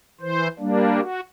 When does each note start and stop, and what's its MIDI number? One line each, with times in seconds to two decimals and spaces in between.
0.21 0.48 52
0.21 0.48 72
0.59 1.00 55
0.59 1.00 58
0.59 1.00 62
1.00 1.21 66